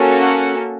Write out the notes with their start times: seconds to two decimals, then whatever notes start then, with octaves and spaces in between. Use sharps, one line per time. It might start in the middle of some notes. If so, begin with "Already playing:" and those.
Already playing: A#3 C#4 F#4 A4
0.22 F#5